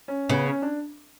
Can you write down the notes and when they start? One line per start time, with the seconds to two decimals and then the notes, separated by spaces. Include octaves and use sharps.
0.08 C#4
0.29 C#3 B3
0.46 C#4
0.62 D4